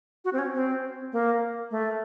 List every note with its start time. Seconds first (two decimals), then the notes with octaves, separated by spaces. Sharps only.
0.25 F#4
0.33 C4
0.39 C#4
0.54 C4
1.13 A#3
1.71 A3